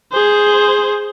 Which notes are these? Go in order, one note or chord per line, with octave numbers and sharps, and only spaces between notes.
G#4 C5